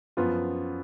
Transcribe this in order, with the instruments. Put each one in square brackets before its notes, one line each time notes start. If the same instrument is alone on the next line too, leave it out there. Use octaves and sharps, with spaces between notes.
[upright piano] F#2 F3 B3 F4